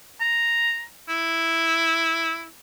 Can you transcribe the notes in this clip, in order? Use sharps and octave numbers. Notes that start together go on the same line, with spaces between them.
A#5
E4